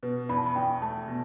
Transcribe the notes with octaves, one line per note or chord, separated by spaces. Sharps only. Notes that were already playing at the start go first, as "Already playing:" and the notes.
B2 B4
E2 B5
A5
B5
E2 G5
A3 A5
B2